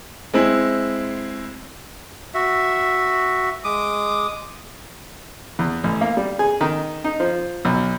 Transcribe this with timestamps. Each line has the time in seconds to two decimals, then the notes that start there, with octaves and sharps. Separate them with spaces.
0.34 G#3 C4 E4
2.34 F#4 E5
3.64 G#3 D6 D#6
5.59 E2
5.84 A1
6.01 A#3
6.17 G3
6.39 G#4
6.61 D#3
7.04 D#4
7.20 F3
7.65 B1